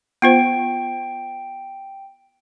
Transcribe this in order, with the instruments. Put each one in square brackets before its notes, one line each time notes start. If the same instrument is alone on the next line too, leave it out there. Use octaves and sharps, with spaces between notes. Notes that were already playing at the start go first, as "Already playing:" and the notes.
[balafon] B3 F4 C5 [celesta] G5 D7